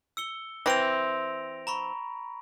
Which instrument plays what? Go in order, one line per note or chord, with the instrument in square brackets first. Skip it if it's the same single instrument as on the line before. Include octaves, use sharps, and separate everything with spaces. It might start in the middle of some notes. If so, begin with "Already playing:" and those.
[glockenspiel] E6 C#7 G7
[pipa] E3 C4 [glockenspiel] A#6 D7 F7
[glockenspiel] A#5 B5 C#6